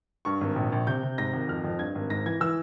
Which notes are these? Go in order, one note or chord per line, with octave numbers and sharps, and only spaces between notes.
G2 C#6
G#1
A#1
A#1
C3 G6
C3
G#2 A#6
G#1
F2 F6
F2
G2 G#6
G#1
G#2 A#6
E3 G#6
E3 E6